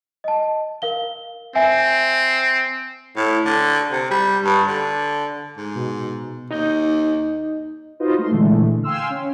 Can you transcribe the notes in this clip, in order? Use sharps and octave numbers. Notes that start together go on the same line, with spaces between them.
D#5 A5
A#4 F5 G7
C4 E5 G#5
A2
D3
C3
G3
G2
D3
G#2
B2
D#2 D#4 D#5 G6
D#4 F4 F#4 B4 C5 D#5
A3 C6
A#2 D3 E3 G#3 A3
F5 G5 G#5 C6 E6 F6
C#4